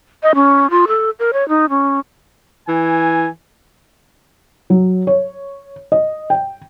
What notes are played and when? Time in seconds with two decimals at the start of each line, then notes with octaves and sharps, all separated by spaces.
0.23 D#5
0.35 C#4
0.70 F4
0.88 A4
1.19 A#4
1.33 C#5
1.49 D#4
1.69 C#4
2.68 E3 G#5
4.70 F#3
5.07 C#5
5.92 D#5
6.30 G5